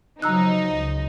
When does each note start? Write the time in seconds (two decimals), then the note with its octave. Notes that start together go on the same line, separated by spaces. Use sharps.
0.22 C#3 F3 F#3 D#4 A#5 E6 F#6
0.71 C#2